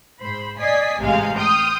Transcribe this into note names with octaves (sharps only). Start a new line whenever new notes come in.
G#2 C5 B5
D5 D#5 G#5 B6 C7
A1 G#2 C3 G#3 F5 G#5
G5 C6 D#6 F6 G6